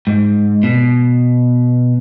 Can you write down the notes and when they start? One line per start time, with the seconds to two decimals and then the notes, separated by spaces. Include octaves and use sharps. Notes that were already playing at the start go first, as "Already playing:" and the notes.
0.07 G#2
0.63 B2